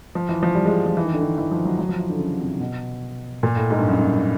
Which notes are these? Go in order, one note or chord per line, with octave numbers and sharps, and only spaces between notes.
F3
E3
F3
G3
G#3
F3
E3
D#3
D3
D#3
E3
F3
F#3
F#3
F3
E3
D3
C#3
C3
B2
A#2
A2
G#2
G2
F#2
G2